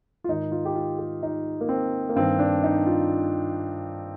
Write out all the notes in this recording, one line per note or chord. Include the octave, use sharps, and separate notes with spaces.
F4
G#2 D#3 D#4
F4
G4
F4
G4
D#4
A#3
C4
A#3
G2 D#3 C4
D4
D#4
F4